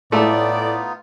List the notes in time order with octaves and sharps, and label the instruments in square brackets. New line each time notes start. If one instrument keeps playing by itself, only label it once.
[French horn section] A2 [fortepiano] A3 [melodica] B3 D#4 F4 [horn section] D5